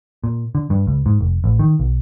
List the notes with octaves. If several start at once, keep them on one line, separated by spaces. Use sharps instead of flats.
A#2
D3
G2
C#2
G#2
F1
A1
D#3
B1